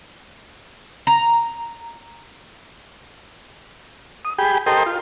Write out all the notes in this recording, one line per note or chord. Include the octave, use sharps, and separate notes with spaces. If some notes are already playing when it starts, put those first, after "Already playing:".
A#5
D#6
G4 G#4 G5 B5
G4 A4 A#4 C5 D#5 G5
F4